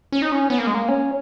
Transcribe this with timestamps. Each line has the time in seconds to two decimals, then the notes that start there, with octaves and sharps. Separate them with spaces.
0.12 C#4
0.22 D#4
0.32 C#4
0.50 B3
0.58 A#3
0.67 G#3
0.75 A#3
0.88 C#4